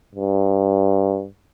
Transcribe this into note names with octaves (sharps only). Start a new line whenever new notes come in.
G2